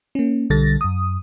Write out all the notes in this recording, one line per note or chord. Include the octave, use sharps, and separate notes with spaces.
A#3 C#4
B1 D3 G3 A4 A6 A#6
F#2 D#6